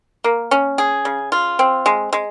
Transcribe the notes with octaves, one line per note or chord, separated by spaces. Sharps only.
A#3
C#4
G#4
C#3
F4
C4
G#3
G#3